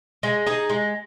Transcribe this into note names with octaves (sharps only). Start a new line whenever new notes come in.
G#3
D#4 G#4
G#3